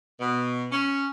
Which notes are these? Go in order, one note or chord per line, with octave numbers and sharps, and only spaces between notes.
B2
C#4